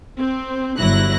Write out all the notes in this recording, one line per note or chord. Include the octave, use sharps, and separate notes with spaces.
C4
G1 F#3 E4 F#6 A#6